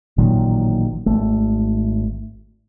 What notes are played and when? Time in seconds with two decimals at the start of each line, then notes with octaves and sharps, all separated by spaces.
0.18 A1 A#2 D#3 F#3
1.06 G#1 A3